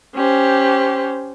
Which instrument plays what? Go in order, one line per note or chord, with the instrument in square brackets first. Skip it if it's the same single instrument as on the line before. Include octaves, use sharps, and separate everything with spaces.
[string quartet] C#4 G4 C5